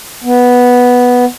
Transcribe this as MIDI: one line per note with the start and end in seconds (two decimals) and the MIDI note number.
0.24 1.25 59